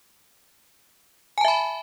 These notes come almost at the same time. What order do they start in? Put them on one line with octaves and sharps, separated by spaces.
G#5 A5 E5 B5